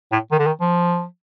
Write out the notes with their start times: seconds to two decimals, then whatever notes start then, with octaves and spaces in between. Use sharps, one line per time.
0.12 A2
0.31 D#3
0.39 D3
0.46 D#3
0.61 F3